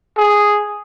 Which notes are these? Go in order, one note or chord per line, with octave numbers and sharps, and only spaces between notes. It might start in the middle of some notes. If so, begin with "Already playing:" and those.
G#4